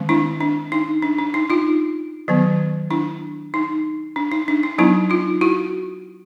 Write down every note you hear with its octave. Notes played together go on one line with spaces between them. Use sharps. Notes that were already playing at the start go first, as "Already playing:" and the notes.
Already playing: D#3 G#3 C4
D4 E4
D4
D#4
D4
D4
D#4
D#4 F4
D#3 F#3 B3
D4 E4
D#4
D4
D#4
D4
D#4
F#3 B3 D4 E4
D#4 F4
E4 F#4